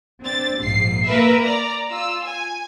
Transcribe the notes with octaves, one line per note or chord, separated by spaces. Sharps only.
C4 D4 A6
A#1 G#2 C7
A#3 A#4 B4 E5
D5 A#5
F4 E6
G#5